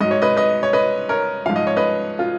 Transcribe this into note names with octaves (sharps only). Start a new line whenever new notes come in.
G#2 F#3 D#5
C#5
B4 D#5
B4 D#5
C#5
B4 D#5
A#4 C#5
G#2 F3 F5
D#5
C#5
B4 D#5
F4